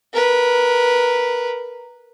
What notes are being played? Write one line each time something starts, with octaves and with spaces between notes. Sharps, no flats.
A#4 B4